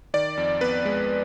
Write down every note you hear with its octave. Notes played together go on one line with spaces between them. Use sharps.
D#3 D5
F2
B3 B4
G#3